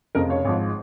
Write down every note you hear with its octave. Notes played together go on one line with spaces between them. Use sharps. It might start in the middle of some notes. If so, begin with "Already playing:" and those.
F1 F2 C#3 F3 A#4 D#5
C#5 F5
G#1 G#2 F3